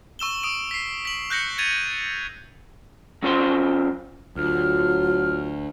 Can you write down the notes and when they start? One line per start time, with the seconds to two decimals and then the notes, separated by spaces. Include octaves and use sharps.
0.19 C#6 E6 E7 G7
0.43 D#6 D7
0.71 B6 C7
1.05 B6 F#7
1.30 F#6 G6 A#6 C#7 F#7
1.58 G#6 A6 D#7 F7
3.23 F#3 C#4 F4 C5 F5 C6
4.36 D2 F#3 F4 F6